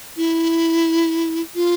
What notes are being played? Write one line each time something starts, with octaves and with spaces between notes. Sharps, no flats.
E4
F4